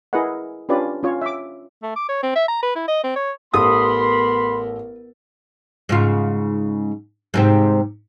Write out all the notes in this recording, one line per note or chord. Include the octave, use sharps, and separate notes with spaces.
E4 G#4 A#4 B4 D#5 F#5
C#4 D4 F4 G4 B4 D5
C#4 F4 C#5
E5 D6
A3
D6
C#5
C4
E5
A#5
B4
E4
D#5
C4
C#5
A1 B3 G4 A4 A#4 B5 C6 D#6
G#2 C#3 F4
G#2 C3 C4